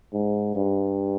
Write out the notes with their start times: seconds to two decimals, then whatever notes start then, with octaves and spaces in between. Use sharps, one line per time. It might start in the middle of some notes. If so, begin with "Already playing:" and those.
0.13 G#2
0.56 G2